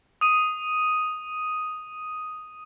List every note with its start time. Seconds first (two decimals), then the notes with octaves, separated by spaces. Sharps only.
0.21 D#6 D#7